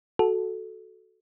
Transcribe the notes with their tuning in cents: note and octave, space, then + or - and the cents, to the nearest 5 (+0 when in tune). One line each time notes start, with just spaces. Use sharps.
F#4 +0 A4 -15